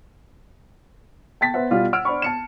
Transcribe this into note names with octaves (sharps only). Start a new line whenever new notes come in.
G5 A5 A6 B6
B3 C5 E5 F#5
B2 G3 F4 F5
F#5 E6 F6 D7
D4 C5 F#5 B5 C#6
A5 C#7 E7